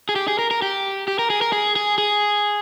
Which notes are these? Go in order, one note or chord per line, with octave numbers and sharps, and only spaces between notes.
G#4
G4
G#4
A#4
A#4
G4
G4
A#4
G#4
A#4
G#4
G#4
G#4